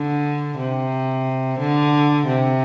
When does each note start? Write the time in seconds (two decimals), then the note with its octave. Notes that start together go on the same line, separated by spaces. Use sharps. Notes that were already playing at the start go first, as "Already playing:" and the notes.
Already playing: D3
0.57 C3
1.59 D3
2.26 C3